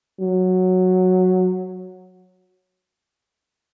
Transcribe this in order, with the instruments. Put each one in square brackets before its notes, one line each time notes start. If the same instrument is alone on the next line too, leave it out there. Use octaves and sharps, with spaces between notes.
[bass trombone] F#3